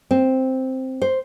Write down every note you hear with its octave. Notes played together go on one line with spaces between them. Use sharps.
C4
C5